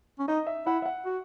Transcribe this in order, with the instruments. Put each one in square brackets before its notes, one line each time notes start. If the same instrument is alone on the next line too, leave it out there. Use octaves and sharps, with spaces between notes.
[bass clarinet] C#4
[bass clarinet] D#4 [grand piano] D#5
[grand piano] E5
[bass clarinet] E4 [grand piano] F#5
[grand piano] E5
F#5
[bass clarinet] F#4